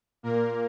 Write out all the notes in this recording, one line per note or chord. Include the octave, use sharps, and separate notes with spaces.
A#2 A#3 A#4